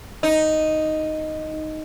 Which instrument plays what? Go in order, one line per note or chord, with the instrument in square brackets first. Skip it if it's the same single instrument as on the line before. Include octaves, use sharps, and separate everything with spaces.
[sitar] D#4